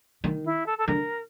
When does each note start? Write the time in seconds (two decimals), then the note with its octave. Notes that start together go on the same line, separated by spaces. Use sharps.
0.24 D#3
0.45 E4
0.66 A4
0.78 A4
0.87 D3 A#4